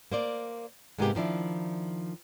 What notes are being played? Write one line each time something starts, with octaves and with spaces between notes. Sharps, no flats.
A#3 C5 D5
G#2 C3 G#3 A#3 B3 G4
D#3 F3 D4 E4